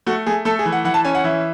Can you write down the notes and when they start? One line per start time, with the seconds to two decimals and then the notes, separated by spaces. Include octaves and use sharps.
0.06 A3 F#4
0.26 A3 G#4
0.45 A3 A4
0.59 G#4
0.65 E3
0.72 F#5
0.84 E3 F#5
0.94 A5
1.04 C#4 G#5
1.15 F#5
1.24 E3 E5